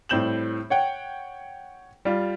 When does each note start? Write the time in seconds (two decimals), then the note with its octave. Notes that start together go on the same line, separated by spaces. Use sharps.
0.09 A2 G3 C4 G6 E7 F#7
0.70 C#5 F#5 G5
2.05 G3 F4